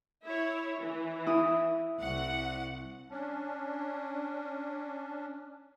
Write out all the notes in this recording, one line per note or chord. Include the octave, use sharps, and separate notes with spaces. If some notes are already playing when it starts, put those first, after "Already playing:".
E4 C#5
E3
E4 D#6
C2 F#5
C#4 D4